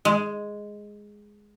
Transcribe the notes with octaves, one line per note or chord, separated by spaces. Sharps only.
G#3